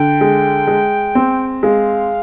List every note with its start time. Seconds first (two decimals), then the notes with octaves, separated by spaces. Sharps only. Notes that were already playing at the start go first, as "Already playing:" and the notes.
Already playing: D3 G5
0.21 G#3
0.67 G#3
1.15 C4
1.63 G#3 F5